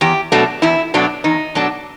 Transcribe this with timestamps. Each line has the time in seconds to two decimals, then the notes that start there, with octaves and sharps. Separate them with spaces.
0.01 E2 G4
0.32 B2 F#3 A3 D4
0.62 E2 E4
0.94 B2 F#3 A3 D4
1.24 E2 D#4
1.55 B2 F#3 A3 D4